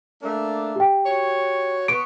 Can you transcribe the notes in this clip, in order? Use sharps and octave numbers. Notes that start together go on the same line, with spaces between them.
A3 A#3 D4
G4 G5
F#4 C#5
B3 C#6 D7